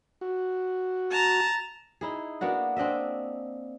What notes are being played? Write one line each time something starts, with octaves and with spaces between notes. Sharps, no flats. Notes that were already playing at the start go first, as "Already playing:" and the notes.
F#4
A5 A#5
D#4 E4 G#4
A#3 B3 D4 F#4
C4 D4 D#5 E5